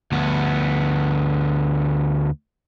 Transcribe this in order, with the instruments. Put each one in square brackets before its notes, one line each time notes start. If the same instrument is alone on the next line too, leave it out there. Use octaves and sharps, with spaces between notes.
[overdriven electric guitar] D2 B3